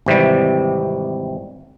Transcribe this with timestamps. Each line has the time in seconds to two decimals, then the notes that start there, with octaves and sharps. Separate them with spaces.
0.06 G#1 C3 E3 G3